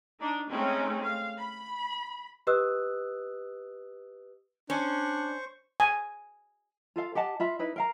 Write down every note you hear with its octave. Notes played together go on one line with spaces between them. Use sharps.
D4 D#4
G#3 A3 C4 C#4 D#4
F5
B5
G4 B4 D#5 D#6 E6 F#6
C#4 D4 C5 C#6
G#5
F4 A4 F5
G4 D#5 F#5 A5
F4 E5 B5
D#4 E4 B4
A#4 F5 A#5